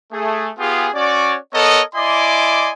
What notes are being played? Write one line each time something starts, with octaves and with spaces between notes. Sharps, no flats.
A3 G#4
B3 F4 G4 G#4
C#4 F#4 C#5 D5
B3 A4 A#4 C#5 D#5
E4 D5 D#5 G#5 C6 D6